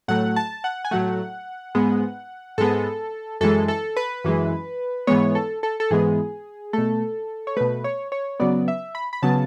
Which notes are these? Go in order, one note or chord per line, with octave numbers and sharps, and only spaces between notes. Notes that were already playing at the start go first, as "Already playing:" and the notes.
A2 F#3 A3 F#5
A5
F#5
G#5
A2 F#3 A3 F#5
G#2 G#3 B3
G#2 G#3 B3 A4
F#2 E3 G#3 A4
A4
B4
F#2 E3 G#3
G#2 E3 G#3 B3 C#5
A4
A4
A4
G#2 E3 G#3 B3 G#4
B2 A3 A4
C#5
B2 A3 B4
C#5
C#5
C#3 F#3 B3 D5
E5
B5
B5
C#3 F#3 B3 A5